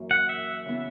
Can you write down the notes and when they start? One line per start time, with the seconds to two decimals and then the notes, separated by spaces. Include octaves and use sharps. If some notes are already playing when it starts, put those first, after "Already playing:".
Already playing: F#2 E3 A#3
0.11 F#5
0.29 E5
0.66 C#3 E3 B3 E4